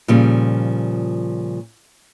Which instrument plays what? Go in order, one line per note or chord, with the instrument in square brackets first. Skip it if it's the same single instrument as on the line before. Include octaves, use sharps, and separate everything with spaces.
[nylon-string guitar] A#2 C#3 F3 G3